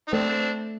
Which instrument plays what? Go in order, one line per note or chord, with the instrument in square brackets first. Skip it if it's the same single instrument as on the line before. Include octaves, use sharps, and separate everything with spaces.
[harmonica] D#4
[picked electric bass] A3 [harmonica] C4 D4